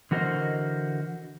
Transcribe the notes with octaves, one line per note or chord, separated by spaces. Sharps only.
D3 E3 F#4 A#4 C5 D#5